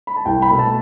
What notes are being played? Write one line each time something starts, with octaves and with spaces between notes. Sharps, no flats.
B5
A5
C2 G5
B5
B2 A3
A5